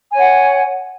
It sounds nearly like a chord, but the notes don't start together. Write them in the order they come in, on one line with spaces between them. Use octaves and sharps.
G#5 C#5 F#5